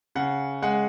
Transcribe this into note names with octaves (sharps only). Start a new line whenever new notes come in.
C#3 F#5
G#3 F#5